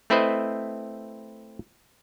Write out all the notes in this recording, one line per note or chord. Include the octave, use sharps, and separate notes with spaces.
A3 C4 E4 B4 C5 D#5